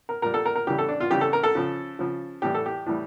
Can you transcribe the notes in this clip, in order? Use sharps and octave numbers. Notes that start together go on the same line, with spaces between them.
A#4
A#2 G3 A#4
A4
A#4
A#4
C#3 E3 G3 G4
A4
D4
F4
C#3 E3 G3 G4
A4
A#4
A4
C#3 F3
C#3 F3
A2 E3 G3 G4
A4
G4
A2 E3 G3